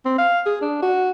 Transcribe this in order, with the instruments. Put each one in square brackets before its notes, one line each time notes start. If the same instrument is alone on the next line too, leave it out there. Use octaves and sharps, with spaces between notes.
[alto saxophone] C4
F5
G#4
D4
F#4